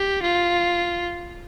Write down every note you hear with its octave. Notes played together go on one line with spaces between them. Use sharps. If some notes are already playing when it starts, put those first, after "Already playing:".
Already playing: G4
F4